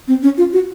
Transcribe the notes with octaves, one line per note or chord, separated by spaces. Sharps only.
C4
C#4
F4
F#4